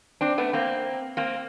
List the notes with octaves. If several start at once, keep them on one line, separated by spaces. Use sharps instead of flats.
C4 D4
A3 B3
A#3 C4
A#3 C4